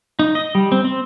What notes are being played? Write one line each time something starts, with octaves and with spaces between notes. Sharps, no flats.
D#4
D#5
G3
C4
C4